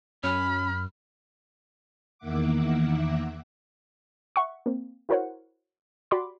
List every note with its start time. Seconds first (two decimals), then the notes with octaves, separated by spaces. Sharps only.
0.24 F#2 C#4 B5 F6
2.18 E2 D#3 A#3 E5 F#5 D6
4.36 E5 F#5 C#6
4.66 A#3 C4
5.09 E4 F#4 A#4 C5 C#5 F#5
6.11 F#4 G4 D5 B5 C6 D6